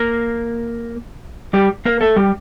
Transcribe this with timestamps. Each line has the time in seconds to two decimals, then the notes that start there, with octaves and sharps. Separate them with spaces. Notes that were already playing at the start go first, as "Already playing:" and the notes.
Already playing: A#3 A#4
1.53 G3 G4
1.85 A#3 A#4
2.01 A3 A4
2.16 G3 G4